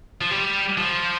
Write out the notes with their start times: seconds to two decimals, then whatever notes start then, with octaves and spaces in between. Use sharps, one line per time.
0.21 F3
0.31 G3
0.78 F3